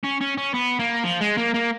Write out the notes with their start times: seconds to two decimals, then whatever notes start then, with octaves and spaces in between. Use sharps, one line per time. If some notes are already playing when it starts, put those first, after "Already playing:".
0.04 C#4
0.21 C#4
0.38 C#4
0.54 B3
0.79 A#3
1.04 F3
1.21 G#3
1.38 A#3
1.54 A#3